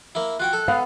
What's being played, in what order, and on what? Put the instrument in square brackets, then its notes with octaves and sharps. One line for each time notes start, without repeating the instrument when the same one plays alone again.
[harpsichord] A#3 E4
[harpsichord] F4 F#4 G5 [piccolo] F#6
[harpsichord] A4
[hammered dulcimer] B3 [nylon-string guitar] F5